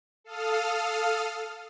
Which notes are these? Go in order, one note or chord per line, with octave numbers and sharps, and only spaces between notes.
A4 F5 D#6 F6